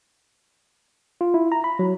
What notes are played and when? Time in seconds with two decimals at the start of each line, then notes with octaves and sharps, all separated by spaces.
1.21 F4
1.34 E4
1.52 A#5
1.64 B5
1.79 F#3